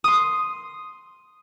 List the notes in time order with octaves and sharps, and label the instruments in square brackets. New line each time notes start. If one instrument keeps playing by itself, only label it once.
[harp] C6 D#6